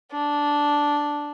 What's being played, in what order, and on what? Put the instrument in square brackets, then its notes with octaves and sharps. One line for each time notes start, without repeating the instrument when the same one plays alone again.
[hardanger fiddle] D4